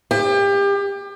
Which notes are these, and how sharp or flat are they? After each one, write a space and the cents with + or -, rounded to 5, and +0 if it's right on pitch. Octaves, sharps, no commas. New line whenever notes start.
G4 +30